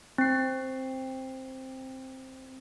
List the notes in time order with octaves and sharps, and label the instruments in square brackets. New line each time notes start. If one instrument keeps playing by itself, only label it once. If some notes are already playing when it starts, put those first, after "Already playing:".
[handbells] C4 C7